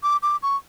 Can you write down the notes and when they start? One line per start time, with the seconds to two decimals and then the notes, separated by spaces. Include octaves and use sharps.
0.03 D6
0.23 D6
0.43 C#6